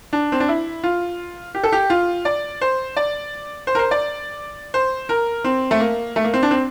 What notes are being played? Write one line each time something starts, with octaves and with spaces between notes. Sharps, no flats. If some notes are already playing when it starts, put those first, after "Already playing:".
D4
C4
D4
E4
F4
G4
A4
G4
F4
D5
C5
D5
C5
A#4
C5
D5
C5
A#4
C4
A3
A#3
A3
A#3
C4
D4
C4